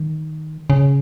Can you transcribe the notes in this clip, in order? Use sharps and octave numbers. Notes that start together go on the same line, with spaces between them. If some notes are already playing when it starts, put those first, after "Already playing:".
Already playing: D#3
C#3